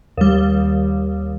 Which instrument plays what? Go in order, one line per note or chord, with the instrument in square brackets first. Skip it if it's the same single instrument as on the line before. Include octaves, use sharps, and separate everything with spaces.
[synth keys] D#2 G3